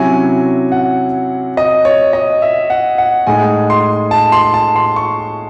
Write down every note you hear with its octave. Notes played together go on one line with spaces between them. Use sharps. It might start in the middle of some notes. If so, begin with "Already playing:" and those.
Already playing: C3 F#3 C#4 E4 G#5
F#5
D#5
C#5
D#5
E5
F#5
F#5
A2 G#3 D#4 G#5
C6
A5
C6
A5
C6
C#6